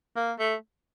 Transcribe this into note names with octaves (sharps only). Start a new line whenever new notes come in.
A#3
A3